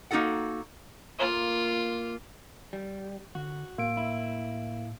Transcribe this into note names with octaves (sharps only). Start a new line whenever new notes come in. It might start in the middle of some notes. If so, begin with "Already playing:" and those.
A#3 D#4 F#4 A4 F#5
A#3 F4 F5
G3
D3 F#4
A2 A#3 D7
E4